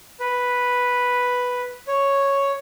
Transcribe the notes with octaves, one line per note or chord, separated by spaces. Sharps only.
B4
C#5